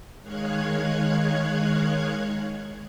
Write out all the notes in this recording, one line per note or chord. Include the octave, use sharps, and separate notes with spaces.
D#3 G#3 C#5 F5 F#6 G#6